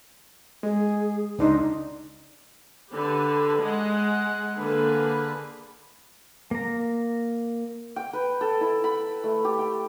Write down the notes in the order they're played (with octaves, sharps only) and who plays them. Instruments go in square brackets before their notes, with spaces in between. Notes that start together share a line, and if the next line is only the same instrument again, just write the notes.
[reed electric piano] G#3 [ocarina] G#4
[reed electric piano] C#2 D4 C6 [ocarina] D#4
[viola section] D3 G4 B4
G#3 F#5
D3 A#3 G#4 B4
[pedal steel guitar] A#3 A#5
[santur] G5
B4
A4
E4
B5
A3
G4
G5